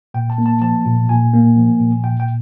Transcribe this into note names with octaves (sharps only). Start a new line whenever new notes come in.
A#2 G5
A5
A#3
A5
F3 A5
A#2
A#2 G#5
A#3
F3
A#2
A#2 G5
G5